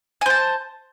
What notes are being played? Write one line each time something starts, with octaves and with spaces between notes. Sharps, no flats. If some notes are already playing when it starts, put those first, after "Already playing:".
C5 G#5 A5